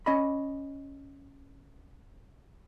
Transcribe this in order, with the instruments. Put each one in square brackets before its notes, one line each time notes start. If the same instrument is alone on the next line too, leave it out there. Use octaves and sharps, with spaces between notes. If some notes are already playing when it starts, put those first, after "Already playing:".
[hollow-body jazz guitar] C#4 D#5 B5